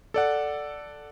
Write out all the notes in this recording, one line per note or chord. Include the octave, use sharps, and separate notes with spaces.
A4 D5 F#5